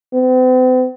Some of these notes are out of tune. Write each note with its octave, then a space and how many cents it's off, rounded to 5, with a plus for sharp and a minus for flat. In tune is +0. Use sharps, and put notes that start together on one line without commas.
C4 -45